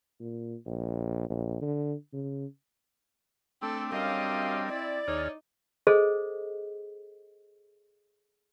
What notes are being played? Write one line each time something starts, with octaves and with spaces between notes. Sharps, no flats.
A#2
A#1
A#1
D3
C#3
A3 C4 D4 A4
F#2 G3 D4 A#4 D#5 F5
E4 D5
D#2 D#4 G#4 C#5 F6
G#4 A4 C5 D#5